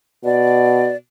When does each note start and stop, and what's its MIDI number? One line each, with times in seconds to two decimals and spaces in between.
0.25 0.93 47
0.25 0.96 74